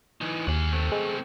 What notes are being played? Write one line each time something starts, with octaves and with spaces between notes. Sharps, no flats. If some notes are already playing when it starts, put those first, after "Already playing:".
E3 D#4
D#2 G#4 F#5
A3 C4
G#3